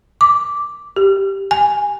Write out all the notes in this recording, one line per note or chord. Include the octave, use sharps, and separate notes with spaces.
D6
G4
G#5